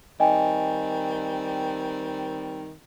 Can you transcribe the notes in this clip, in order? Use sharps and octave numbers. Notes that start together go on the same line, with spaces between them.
D#3 G3 C4 D#5 G5 G#5